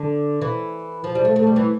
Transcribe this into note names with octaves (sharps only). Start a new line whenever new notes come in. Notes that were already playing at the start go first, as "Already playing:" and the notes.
Already playing: D3
E3
F3
G3
A3
A3
G3
E3